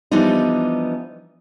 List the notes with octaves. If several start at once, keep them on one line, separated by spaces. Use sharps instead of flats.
E3 F3 G3 B3 D4 D#4